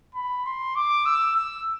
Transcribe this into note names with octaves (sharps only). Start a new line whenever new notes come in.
B5
C6
D6
E6
E6